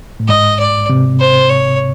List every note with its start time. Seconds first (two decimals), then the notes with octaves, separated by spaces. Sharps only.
0.20 A2
0.28 G#2 D#5
0.59 D5
0.89 C3
1.19 C5
1.50 C#5